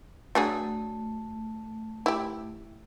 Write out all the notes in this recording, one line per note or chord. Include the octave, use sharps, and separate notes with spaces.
F#3 A3 D4 G#4
E4 G4